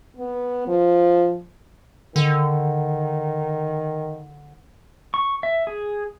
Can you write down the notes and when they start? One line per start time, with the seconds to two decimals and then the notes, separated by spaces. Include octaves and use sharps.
0.17 B3
0.67 F3
2.16 D3 D#3
5.14 C#6
5.43 E5
5.67 G#4